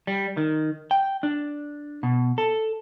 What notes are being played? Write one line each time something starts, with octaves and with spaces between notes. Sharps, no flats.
G3
D#3
G5
D4
B2
A4